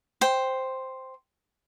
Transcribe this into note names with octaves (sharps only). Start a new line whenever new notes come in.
C5 G5